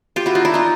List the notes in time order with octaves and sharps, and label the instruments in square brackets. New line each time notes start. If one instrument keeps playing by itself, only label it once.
[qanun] F4 G4
E4 F#4
D#4 F4
D4 E4
D#4 F4